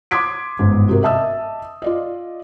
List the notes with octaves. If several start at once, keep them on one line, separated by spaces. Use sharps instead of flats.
C6 D6 D#6 G#6 B6 D7
G1 G#2
C3 F#4 A#4
D#5 E5 A5 D#6 E6
F4 D5 D#5